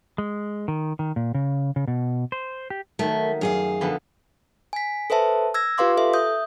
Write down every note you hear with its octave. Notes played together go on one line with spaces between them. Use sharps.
G#3
D#3
D#3
A#2
C#3
C#3
B2
C5
G4
D#3 F#3 A3
F#2 G#4 F5
F2 D3 B3
G#5 B6
A4 B4 C5 E5 A5
E6 G#6 A#6
F4 G4 B4 F5 C6 D6
A4 E5
E5 D#6 G6